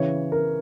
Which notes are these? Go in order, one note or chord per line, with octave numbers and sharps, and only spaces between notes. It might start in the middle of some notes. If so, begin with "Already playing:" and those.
Already playing: C#3 E3 C#5
A#4